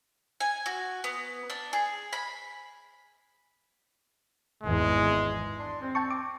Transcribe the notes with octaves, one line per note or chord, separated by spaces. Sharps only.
G#5
F#4
B3
D4
G#4
B5
G#1 E2 G#3
D4 D5 C6
C4
G5 A5 C#6
D6